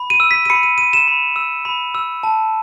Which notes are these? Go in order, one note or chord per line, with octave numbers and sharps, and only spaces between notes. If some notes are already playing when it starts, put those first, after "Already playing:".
Already playing: B5
D#7
E6
B6
D#7
B5 C#7
D#7
E6 D#7
E7
B5
E6
B5
E6
A5